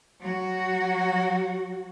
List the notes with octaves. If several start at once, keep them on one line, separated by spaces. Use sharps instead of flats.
F#3 F#4